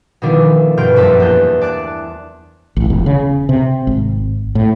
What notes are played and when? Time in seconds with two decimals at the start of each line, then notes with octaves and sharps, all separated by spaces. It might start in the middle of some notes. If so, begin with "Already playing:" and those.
0.22 B2 D#3 F3 D4 E4 F4
0.45 A3
0.77 G2 B2 C6 F6 G6 D7
0.96 A#1 F#2 E5 A5
1.20 E2 A#3 G6 A6
1.61 D5 A5 F#6
2.76 A1
2.90 E1
3.06 C#3
3.49 C3
3.87 G#1
4.55 A2